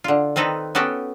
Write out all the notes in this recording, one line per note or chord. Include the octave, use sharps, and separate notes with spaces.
D3 F4
D#3 C4 D#4 A4 B4
B3 C#4 F#4 G4 A4